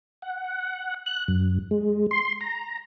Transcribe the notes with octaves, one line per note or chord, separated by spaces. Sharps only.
F#5
F#6
F#2
G#3
C6
A#5